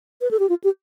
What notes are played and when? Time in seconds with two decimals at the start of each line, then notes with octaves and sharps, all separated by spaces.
0.21 B4
0.31 A4
0.39 G4
0.49 F4
0.64 G4